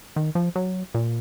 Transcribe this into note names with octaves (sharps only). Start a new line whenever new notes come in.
D#3
F3
F#3
A#2